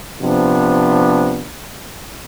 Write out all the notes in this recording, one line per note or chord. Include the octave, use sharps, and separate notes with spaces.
C3 F3 B3 D4